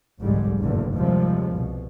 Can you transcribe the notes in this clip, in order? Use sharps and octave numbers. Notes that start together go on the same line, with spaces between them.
F1 C2 G#2 D3 G3 G#3
F#1 E2 G2 A#2 D3
D#2 C3 F3 G3 G#3
C2 B2